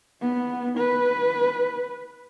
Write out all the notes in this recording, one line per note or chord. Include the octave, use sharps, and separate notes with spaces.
B3
B4